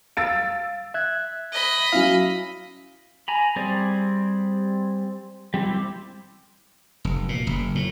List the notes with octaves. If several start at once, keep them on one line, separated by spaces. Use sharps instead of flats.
F5 E6 A6 D7
E5 F#6 G#6
D#5 B5
F#3 C#4 E4 F5
G#5 A#5 B5
G3 C4 G#4 C5 D5
G3 C4 E4 G4
F1
A#2
F#1
A2